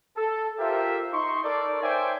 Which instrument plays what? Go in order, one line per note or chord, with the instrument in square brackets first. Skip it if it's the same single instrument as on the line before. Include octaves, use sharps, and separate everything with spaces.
[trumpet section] A4
F4 G4 A#4 C5 E5
D#4 C6 C#6
D#4 A4 A#4 D5
C5 C#5 E5 G5 G#5 D6